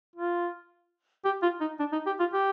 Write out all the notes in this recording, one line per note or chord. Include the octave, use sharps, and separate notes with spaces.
F4
G4
F4
D#4
D4
D#4
G4
F4
G4